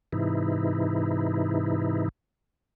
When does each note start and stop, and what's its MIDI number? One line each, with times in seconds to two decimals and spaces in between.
0.13 2.09 44
0.13 2.09 48
0.13 2.09 52
0.13 2.09 63
0.13 2.09 64